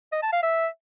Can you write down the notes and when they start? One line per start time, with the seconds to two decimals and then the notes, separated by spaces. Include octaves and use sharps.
0.12 D#5
0.22 A5
0.33 F5
0.43 E5